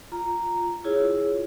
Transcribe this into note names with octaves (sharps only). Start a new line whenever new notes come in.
F4 A#5
E4 F4 G#4 C#5